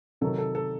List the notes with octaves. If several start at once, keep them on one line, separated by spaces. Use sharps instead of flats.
C3 D#3 F#3 A4
A4
A4